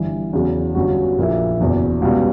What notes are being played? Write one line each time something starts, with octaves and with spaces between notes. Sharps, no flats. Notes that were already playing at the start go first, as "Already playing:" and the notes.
Already playing: G1 G2 E3
E2 C#3 F#3 B3 F#4
G1 G2 F#3 C#4 F#4
A#1 A#2 A#3 E4
F#1 E2 B2
C#2 B2 G3 B3